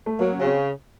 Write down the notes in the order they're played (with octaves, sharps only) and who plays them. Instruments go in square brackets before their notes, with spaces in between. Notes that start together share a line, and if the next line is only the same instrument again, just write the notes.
[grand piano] A3
[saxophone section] F#3 [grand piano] A#3
[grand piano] C#4
[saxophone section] C#3
[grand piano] C4